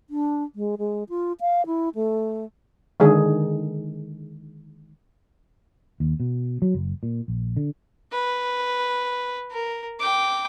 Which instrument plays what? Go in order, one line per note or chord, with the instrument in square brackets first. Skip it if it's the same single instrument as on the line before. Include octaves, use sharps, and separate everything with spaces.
[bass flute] D4
G#3
G#3
F4
F5
E4
A3
[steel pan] D3 D#3 G#3 G#4
[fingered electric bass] D#2
B2
F#3
F#1
A#2
A#1
D3
[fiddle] B4
A#4
G5 D6